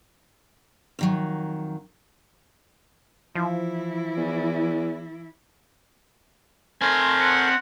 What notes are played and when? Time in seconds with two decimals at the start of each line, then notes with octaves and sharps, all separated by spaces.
0.99 F2 D#3 F#3
3.35 E3 F3 E4
4.17 E2
6.82 A3 C4 A#4 C5 G#5
7.21 F#5